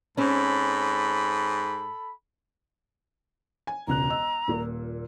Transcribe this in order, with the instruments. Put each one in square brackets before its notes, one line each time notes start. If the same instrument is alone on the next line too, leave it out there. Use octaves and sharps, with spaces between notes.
[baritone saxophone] G#2 [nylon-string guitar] C4 C#4 [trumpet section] A4 B5
[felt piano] G#5
[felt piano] E1 C#2 F#6 [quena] A#5
[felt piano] D#5 E6
D#1 A#2